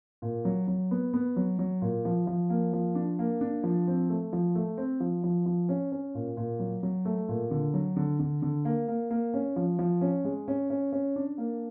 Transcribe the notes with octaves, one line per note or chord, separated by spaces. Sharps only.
A#2
F#3
F#3
B3
B3
F#3
F#3
A#2
F3
F3
A#3
F3
D4
A#3
D4
F3
C4
A3
F3
A3
C4
F3
F3
F3
C#4
C#4
A#2
A#2
F#3
F#3
A3
A#2
D3
F#3
D3
D3
D3
A#3
A#3
A#3
C#4
F3
F3
C#4
G#3
C#4
C#4
C#4
D4
A#3